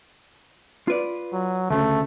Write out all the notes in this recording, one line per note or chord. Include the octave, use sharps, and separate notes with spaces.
F4 B4 D5
F#3
D2 C#3 A3